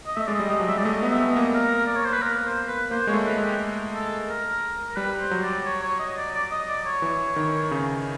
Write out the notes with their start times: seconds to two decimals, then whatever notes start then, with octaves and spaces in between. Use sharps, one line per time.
0.06 D#5
0.16 A3 E5
0.27 G#3 D5
0.34 D#5
0.40 G3
0.50 G#3 D#5
0.60 F#3
0.68 G3 E5
0.77 G#3 D5
0.85 A3 D#5
1.02 B3 D#5
1.08 E5
1.19 B3
1.31 D#5
1.36 A#3
1.54 A#4
1.86 D5
1.96 C#5
2.04 C5
2.13 B4
2.22 A#4
2.45 C5
2.68 B4
2.91 A#3 C5
3.07 G#3 C#5
3.14 A3
3.26 A3 B4
3.37 G#3
3.43 G4
3.94 A4
4.29 A#4
4.88 A#4
4.97 G3 B4
5.20 C5
5.31 F#3
5.43 D5
5.65 C#5
5.83 C#5
5.99 D#5
6.17 D5
6.34 D5
6.52 D#5
6.68 D5
6.86 C#5
7.02 E3
7.36 D#3
7.71 C#3